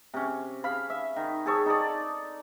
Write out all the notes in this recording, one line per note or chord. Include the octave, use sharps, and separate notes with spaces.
C3 C#4
F5 B5
E5
D#3
G#4 A4 C#5
D#4 A4 D5